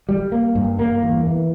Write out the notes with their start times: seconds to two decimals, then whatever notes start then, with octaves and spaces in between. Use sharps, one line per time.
0.09 G3
0.32 A#3
0.55 G2
0.79 A#3
1.02 E2
1.25 E3